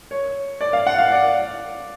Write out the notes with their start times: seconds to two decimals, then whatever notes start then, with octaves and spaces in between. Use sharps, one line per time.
0.11 C#5
0.61 D5
0.73 F5
0.87 F#5
0.98 F5
1.12 D5